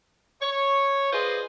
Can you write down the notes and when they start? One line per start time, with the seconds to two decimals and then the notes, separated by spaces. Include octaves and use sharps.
0.42 C#5
1.12 F4 G#4 B4 C5 D5 D#5